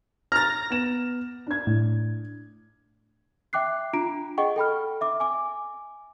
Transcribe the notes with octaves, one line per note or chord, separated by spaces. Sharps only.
A#5 F6 A6 A#6
B3 E7
D4 G#6
A2
E5 G5 D6 F#6 C7
D4 F4 A#5 D7
G#4 D#5 F#5 G5 C#6
A4 G5 B5 F6
E5 D6
G#5 D6